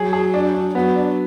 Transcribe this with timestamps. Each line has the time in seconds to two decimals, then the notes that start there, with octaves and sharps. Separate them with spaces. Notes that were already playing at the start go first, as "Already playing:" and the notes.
Already playing: F#3 G#4
0.13 G#4
0.34 D4
0.55 D4
0.75 F#3 B3
0.96 D4